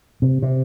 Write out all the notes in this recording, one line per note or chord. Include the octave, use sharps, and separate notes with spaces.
C3
C3